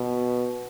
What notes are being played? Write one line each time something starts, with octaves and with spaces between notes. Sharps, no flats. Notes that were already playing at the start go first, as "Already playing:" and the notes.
Already playing: B2